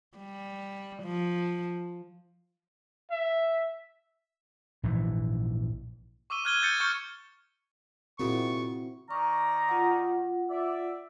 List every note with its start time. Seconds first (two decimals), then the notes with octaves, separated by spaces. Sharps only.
0.18 G3
1.03 F3
3.11 E5
4.83 A#1 G#2 C#3 E3
6.30 C#6 D6 E6 D#7 G7
6.45 F6 F#6 G#6 D#7 G7
6.62 G6 A6 C#7
6.80 C#6 F6 G6 C#7 G7
8.20 A#2 C#3 G#3 C4 E4 F#4 C#6
9.11 D#3 D5 A#5 C#6
9.69 F4 F#5
10.50 D5 E5